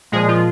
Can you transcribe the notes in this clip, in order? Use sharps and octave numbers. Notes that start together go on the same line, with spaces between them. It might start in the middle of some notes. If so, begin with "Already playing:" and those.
A#2 F3 G#3 G#4
F3 F4